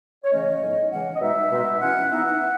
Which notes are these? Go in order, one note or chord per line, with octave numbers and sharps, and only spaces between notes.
C#5
C#3 E3 A3 C#4 D#5
A2 F#3 B3 D#4
C#3 E3 G#3 C#4 F#5
D#5
B2 G#3 D#4 E5
B2 G#3 D#4
E3 G#3 C#4 F#5
E3 B3 D#4 E5
F#5
E3